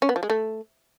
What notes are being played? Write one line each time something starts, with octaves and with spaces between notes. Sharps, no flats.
C#4
B3
F3
G#3
A3